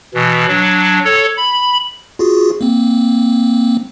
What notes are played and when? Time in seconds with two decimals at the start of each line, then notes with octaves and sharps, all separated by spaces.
0.14 B2 E3
0.48 F#3 D4
1.05 A4 C#5
1.37 B5
2.19 F4 F#4 G#4
2.61 A#3 C4